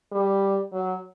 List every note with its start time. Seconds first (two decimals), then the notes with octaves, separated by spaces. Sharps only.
0.12 G3
0.73 F#3